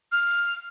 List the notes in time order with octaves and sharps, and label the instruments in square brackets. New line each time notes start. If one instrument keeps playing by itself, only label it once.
[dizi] F6